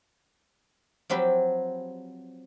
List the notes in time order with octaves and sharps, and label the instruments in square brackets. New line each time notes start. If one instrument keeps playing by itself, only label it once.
[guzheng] F3 F#3 C4 G4 B4